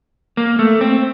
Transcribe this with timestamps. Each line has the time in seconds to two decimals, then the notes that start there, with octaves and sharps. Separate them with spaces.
0.37 A#3
0.59 A3
0.81 C4